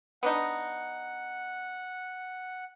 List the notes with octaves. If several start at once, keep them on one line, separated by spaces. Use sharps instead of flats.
B3 D4 D#4 F#5